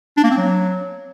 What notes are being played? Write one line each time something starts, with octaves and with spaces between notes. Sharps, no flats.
D4
A#3
C4
F#3